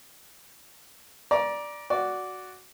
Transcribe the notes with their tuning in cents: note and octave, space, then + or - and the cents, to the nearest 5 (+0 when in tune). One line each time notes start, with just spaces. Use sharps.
D5 +0 A#5 +30
F#4 +0 D5 -10